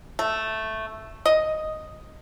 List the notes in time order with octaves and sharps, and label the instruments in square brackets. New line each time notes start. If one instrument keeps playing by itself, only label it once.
[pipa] A3
D#5